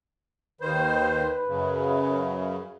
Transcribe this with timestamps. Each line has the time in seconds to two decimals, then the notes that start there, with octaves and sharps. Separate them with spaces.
0.61 D#2 D#3 B4 C5
1.48 F#2 C#3